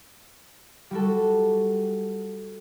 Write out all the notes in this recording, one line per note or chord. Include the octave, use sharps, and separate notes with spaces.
G3 F#4 A4